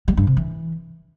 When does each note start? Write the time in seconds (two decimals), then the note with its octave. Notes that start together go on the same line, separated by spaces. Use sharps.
0.08 G3
0.17 G2
0.27 C3
0.37 E3